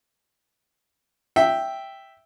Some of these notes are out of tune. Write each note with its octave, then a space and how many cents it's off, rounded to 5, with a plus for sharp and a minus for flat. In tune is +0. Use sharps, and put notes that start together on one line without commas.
E5 +0 G5 +0